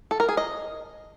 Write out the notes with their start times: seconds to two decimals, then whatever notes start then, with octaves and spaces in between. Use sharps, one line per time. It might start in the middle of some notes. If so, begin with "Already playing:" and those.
0.11 A4
0.20 A#4
0.29 G#4
0.37 D#5